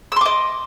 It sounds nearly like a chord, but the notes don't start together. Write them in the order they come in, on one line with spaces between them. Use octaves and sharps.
E6 C6 D6 D#5